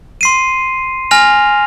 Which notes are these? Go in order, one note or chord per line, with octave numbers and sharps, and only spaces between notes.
C6 C7 D#7
G#5 F6 A#6 F7